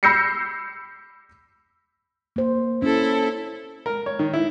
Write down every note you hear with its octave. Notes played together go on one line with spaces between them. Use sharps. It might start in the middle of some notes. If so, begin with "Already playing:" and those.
B5 E6 G6 A#6 C7 C#7
A#3 C5
C#4 E4 A4
A#4
C#5
D#3
E4